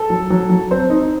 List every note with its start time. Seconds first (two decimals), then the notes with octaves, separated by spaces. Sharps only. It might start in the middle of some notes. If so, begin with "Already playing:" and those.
Already playing: A4
0.10 F#3
0.30 F#3
0.50 F#3
0.71 C4 C5
0.90 D#4